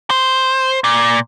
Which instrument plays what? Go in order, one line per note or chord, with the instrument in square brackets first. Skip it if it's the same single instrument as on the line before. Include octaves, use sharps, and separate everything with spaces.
[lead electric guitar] C5
A#2